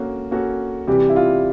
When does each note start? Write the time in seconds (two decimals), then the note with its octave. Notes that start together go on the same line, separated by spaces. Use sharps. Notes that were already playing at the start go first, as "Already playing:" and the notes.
Already playing: A#3 C#4 F#4 A4
0.31 A#3 C#4 F#4 A4
0.87 C3 E3 G3 G4
1.10 E4
1.16 F4